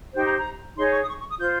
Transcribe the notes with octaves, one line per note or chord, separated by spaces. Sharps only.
D#4 G4 C5 G5
A#5
A#5
D#4 G#4 C#5 C6
C#6
D#6
C#6
C#6
D#6
F4 C5 G6